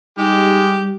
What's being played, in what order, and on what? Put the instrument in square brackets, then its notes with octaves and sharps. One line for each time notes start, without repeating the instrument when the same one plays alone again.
[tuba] G3 [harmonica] G#3 G4 [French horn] D#4